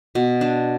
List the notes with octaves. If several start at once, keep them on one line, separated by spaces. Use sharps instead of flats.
B2
D4